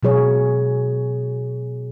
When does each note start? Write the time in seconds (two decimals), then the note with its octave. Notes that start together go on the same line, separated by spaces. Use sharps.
0.03 B2 F#3 G#4 C#5